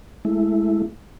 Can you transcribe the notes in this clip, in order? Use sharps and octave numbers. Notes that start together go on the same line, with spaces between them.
G#3 A3 E4